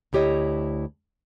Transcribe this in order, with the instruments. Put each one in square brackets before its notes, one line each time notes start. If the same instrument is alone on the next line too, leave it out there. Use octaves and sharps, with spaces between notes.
[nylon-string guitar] D2 E4 G4 C#5 D#5